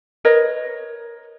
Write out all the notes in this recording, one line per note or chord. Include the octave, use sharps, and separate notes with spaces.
A#4 B4 C#5 D#5